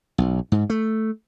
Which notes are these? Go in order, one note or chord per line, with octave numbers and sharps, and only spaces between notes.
B1
G#2
A3